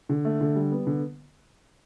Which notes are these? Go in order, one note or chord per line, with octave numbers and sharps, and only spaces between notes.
D3
A3
D3
G3
B3
D3